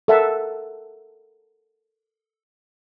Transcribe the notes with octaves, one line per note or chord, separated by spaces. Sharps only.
A4 A#4 E5 F#5 A5